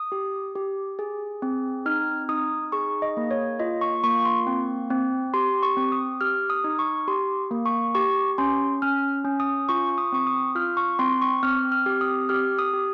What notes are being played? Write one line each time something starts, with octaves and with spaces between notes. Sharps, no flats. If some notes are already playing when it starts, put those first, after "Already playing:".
Already playing: D#6
G4
G4
G#4
C4
D#4 F6
D#4 D#6
G#4 C#6
D#5
A#3
C#5
F4 D#5
C#6
A#3 C#6
C6
C4
C4
G4 C6
C#6
C4
D#6
G4 F6
D#6
D#4
C#6
G4 C6
A#3
C#6
G4 C#6
C#4 C6
C#4 F6
C#4
D#6
F4 C#6
C#6
D#6
C4 C#6
D#6
F4 F6
C#6
C4 C6
C#6
C4 F6
F6
G4
D#6
G4 F6
D#6
G4